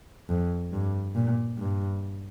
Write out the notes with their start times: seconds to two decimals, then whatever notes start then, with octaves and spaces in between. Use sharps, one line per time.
0.29 F2
0.73 G2
1.15 A#2
1.58 G2